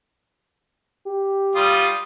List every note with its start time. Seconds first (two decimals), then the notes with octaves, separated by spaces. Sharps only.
1.07 G4
1.55 G3 F4 D#6